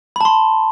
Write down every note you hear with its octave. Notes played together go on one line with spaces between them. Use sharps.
A5 B5 C6